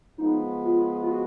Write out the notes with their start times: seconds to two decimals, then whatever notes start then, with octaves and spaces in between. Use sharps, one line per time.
0.18 F3 G#3 B3 D#4
0.64 F4
1.03 F4
1.11 F#4